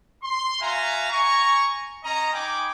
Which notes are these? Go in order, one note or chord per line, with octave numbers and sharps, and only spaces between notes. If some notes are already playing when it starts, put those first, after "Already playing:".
C6
F#4 E5 F5 G#5 A#5
G#5 A#5 C#6
C#4 D#5 A#5
D#4 G5 G#5 B5 D6